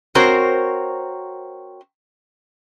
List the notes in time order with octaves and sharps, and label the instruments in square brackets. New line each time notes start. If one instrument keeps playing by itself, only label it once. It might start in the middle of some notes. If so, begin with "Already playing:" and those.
[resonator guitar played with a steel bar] C4 F#4 A#4 C5 C#5